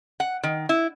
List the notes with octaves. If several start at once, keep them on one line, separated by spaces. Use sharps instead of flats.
F#5
D#3
E4